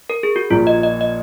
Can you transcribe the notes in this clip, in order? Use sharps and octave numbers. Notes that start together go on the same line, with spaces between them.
A#4
G#4
F#4
A#1 A#2 F3 A#3 F4
D#5
D#5
D#5